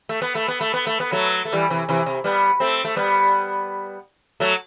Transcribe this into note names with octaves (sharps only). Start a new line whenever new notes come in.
A3
B3
A3
B3
A3
B3
A3
B3
F#3 A3
A3
E3 G3
C3 E3
C3 E3
C3
G3 B3
A3 C4
A3
G3 B3
F#3 A3